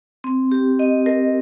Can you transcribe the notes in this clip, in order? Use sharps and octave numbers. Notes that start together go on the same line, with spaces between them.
C4
G4
D#5
A#4